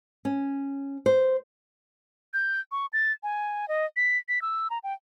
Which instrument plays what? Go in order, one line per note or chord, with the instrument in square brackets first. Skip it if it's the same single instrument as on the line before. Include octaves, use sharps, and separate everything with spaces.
[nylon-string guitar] C#4
C5
[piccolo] G6
C#6
A6
G#5
D#5
B6
B6
E6
A#5
G5